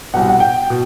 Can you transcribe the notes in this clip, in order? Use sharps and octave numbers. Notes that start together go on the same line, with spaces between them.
C2 B2 F#5
F#5
G5
B2